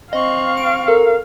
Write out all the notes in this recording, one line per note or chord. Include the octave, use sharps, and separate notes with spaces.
C4 D#5 F5 C#6
D7
A4 A#4